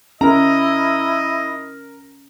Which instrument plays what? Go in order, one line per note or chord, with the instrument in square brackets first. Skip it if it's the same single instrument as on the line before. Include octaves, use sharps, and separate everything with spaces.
[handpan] C#4 [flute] E4 [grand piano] A#4 A#5 [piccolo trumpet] D#5